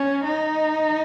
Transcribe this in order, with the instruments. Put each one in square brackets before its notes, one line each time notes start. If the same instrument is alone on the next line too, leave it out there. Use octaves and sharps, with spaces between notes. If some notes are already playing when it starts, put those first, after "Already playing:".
Already playing: [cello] C#4
D#4